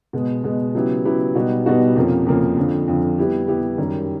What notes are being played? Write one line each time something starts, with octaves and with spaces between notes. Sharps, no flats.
B2 G#3 B3
B2 G#3 B3
C#3 F#3 B3 E4 G4
C#3 F#3 B3 E4 G4
B2 G3 B3 D#4 F#4
B2 G3 B3 D#4 F#4
F2 C3 F3 A#3 C#4
F2 C3 F3 A#3 C#4
F2 D3 F3
F2 D3 F3
G3 B3 E4 G4
G3 B3 E4 G4
F#2 D#3 G3